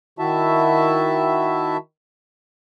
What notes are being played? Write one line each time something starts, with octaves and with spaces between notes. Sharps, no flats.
D#3 E4 F#4 E5 A5